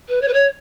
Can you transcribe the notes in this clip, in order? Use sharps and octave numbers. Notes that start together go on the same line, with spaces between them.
B4
C#5
B4
C#5